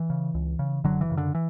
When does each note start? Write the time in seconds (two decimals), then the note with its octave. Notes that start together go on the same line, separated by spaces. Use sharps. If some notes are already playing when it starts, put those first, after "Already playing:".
Already playing: E3
0.10 C#3
0.34 C#2
0.59 C#3
0.84 F#1 D3 F#3
1.01 E3
1.09 F#2 C#3
1.17 D3
1.35 E3